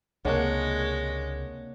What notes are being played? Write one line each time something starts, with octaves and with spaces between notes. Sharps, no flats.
C#2 C3 G#3 A#3 D4 C#5 F#5